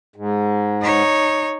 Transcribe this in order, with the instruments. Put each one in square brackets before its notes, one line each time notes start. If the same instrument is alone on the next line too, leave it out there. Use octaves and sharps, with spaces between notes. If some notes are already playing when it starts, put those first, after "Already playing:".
[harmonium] G#2
[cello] D#4 C#5